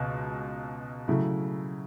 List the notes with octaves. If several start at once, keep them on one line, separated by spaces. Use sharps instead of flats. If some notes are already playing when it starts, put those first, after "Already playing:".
Already playing: C#2 B2
C#3 F#3 A3 E4